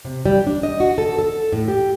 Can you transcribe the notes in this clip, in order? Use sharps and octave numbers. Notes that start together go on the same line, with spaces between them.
C3
G3
D4
D#5
F#4
A4
A4
A2
G4